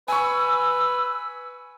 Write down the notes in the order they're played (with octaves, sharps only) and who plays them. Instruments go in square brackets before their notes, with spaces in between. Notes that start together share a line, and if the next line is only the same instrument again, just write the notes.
[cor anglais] B4 [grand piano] G#5 C#6 [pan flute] E6